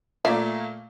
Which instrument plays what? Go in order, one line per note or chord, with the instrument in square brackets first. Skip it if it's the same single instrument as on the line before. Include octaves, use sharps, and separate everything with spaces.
[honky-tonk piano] A#2 A3 A#3 [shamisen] D5 E5 F5